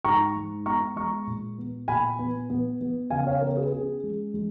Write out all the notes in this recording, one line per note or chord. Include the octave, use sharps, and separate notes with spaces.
G#2 A#5 C#6
G#3
B3 A#5 C#6
G#3 A#5 C#6
A#2
B3
A#2 G#5 B5
B3
B3
B3
C#3 F5 G#5
C#5 F5
B3 A#4 C#5
G#4 B4
C#4 G#4
G#3
G#3